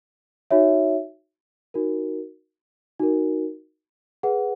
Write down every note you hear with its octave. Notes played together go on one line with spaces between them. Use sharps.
D#4 F#4 C#5 E5
D#4 F#4 A#4
D#4 F#4 A#4
G#4 B4 F#5